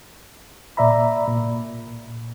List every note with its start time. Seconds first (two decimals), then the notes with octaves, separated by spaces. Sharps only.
0.77 A#2 D5 E5 A#5 B5
1.28 A#2